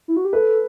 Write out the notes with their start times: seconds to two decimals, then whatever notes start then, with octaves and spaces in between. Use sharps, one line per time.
0.08 E4
0.17 F#4
0.25 G4
0.33 A4 B4